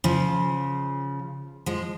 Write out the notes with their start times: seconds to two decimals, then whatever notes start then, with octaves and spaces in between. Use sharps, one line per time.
0.04 C#3 F3
1.66 F3 G#3